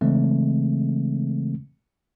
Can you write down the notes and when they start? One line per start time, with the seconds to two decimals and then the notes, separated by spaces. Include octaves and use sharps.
0.01 C#3 E3 G#3 A3 C4